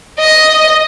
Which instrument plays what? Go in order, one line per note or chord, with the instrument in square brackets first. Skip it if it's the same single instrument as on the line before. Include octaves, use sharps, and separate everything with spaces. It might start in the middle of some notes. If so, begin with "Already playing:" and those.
[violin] D#5